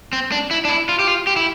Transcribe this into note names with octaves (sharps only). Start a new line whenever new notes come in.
C4
D4
E4
D4
E4
F4
G4
F4
G4
E4